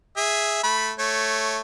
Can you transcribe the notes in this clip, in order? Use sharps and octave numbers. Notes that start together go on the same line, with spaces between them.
G#4 E5
A3 B5
A3 C#5